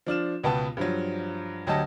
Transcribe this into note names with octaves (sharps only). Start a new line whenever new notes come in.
F3 D4 F6 E7
C#2 B2 B3 G5 A5
G2 F3 F#3
D2 F#3 G4 D#5 A5